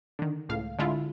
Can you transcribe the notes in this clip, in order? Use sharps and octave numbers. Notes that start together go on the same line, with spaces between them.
D3 D#3
C#2 A2 F5
D3 G#3 E4 F4